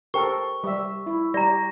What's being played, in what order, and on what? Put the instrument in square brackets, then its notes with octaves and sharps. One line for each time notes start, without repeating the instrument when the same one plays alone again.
[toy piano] G4 C5 G5 [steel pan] A4 A#4 [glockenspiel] C#6
[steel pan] G3 E5
E4
[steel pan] G3 G4 [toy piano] D5 A#5 [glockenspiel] A#6